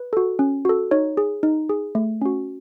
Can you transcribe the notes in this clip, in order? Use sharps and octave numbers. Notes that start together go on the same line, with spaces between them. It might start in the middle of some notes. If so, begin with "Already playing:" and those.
Already playing: B4
F#4 A4
C#4
F#4 A4
D#4 C#5
G#4
D#4
G#4
A3
C#4 F#4